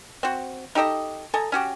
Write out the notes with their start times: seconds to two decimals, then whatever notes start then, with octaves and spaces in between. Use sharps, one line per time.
0.23 C4 F#4
0.75 D#4 G4 A4 D#5
1.34 A4 D#5 G#5 A#5
1.52 C#4 F#4 G4